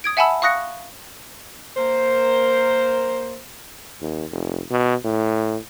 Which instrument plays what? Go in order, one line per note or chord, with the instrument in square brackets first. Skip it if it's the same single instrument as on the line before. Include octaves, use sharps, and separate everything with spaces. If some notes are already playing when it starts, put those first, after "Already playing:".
[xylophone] D#6 G#6 D7
E5 F#5 G#5 A5 B5 E6
F5 C#6 D#6 F#6 A#6 C#7
[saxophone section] A#3 A#4 C5
[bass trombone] D#2
F1
B2
A2